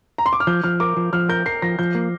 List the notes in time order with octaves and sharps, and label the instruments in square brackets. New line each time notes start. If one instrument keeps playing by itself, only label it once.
[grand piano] A#5
C6
D6
F6
[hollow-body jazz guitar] F3 [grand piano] G6
[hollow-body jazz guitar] F3 [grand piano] F6
[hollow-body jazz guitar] A#4 [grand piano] D6
[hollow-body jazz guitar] F3
[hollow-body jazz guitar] F3 [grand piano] F6
[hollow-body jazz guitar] A#4 [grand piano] G6
[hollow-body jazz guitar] A#4 [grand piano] C7
[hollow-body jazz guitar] F3 [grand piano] A#6
[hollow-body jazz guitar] F3 [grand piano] G6
[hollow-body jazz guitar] A#3